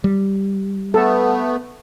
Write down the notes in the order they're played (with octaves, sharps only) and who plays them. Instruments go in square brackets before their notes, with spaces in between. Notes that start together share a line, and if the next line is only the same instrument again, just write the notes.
[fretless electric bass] G3
[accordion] A3 B3 [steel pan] A4